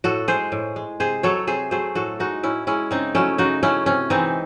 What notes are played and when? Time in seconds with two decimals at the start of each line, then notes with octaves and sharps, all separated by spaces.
0.04 A2 F#4 A4
0.28 G#3 G#4 C5
0.52 A2
0.76 G#3
1.00 C3 G#4 C5
1.23 F#3 A3 A4 C#5
1.47 C3 G#4 C5
1.71 F#3 A3 G#4 C5
1.95 A2 F#4 A4
2.20 G#3 D#4 F#4
2.43 A2 C#4 E4
2.67 G#3 C#4 E4
2.91 C#3 C4 D#4
3.15 F#3 A3 C#4 E4
3.38 C#3 D#4 F#4
3.63 F#3 A3 C#4 E4
3.86 C3 C#4
4.10 E3 G#3 C4 D#4